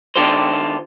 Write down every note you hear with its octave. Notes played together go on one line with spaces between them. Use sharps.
D#3 D4 F4 G4 A4 C5